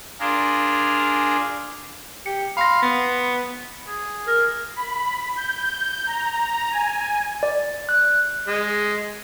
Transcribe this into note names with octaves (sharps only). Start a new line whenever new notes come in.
D4 F4 G#4 A#4
G4 C#7
F5 B5 C6 A#6
B3
G#4
A#4
B5
G6
A#5
G#5
D5
F#6
G#3